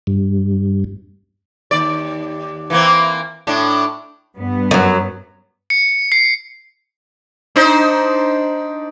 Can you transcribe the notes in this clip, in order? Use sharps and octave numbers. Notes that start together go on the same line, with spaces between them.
G2
D#2 D5
E3 A#3 C4
A2 D4
G2 B3
F#2 F#3
C#7
C7
D4 D#4 C5